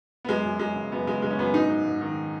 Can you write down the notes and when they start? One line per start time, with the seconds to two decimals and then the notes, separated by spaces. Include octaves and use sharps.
0.25 B3
0.29 F#2 G#3
0.45 F#2
0.59 F#2 G#3
0.76 C#3
0.92 F#2 B3
1.07 C#3 G#3
1.22 F#2 G#3
1.30 C#4
1.38 F#2 B3
1.54 G#2 D#4
1.69 G#2
1.85 G#2
2.01 D#3